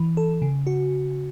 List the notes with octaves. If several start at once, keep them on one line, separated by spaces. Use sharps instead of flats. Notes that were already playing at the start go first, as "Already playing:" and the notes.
Already playing: E3
A4
C#3
F#4